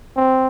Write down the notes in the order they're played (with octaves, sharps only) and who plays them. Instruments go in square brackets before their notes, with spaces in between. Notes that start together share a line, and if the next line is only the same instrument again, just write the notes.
[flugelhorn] C4